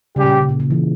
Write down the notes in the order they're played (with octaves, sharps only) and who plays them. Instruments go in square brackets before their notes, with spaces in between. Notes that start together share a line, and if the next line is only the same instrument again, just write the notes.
[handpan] C#3 [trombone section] G3 C#4 G4
[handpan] A#2
C#3
A#2
C#3
E3